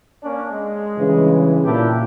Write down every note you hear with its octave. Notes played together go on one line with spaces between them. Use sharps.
A#3 C#4 D4
G#3
G2 C#3 E3
A#2 D4 E4 G4